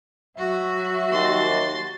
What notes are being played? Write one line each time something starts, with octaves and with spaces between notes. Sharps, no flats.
F#3 F#4 E5
D#2 C6 A6